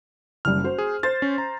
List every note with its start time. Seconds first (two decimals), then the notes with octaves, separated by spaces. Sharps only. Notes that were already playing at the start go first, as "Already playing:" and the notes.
0.45 F#1 G3 F6
0.64 F#4 C5
0.78 G#4
1.03 C5 C6 A6
1.22 C#4
1.38 A#5